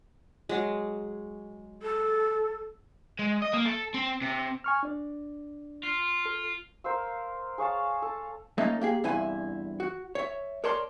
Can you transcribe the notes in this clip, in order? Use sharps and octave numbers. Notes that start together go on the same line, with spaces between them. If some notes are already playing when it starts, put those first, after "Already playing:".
F#3 G#3
A4
G#3
D#5
A#3
A4
C4
C3
G#5 C#6 F6
D4 D5
F4
A4
A#4 C5 F5 E6
G#4 C#5 F5 A5
A4
A3 A#3 C#4 D#4 A4 D#5
A#3 G4 G#4
E2 G2 C3 E4 G#5
F#4
C#5 E5
A#4 C#5 D5 A5 C6